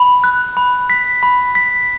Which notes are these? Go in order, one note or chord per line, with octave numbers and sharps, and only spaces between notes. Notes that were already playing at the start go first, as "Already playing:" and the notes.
Already playing: B5
F#6
B5
B6
B5
B6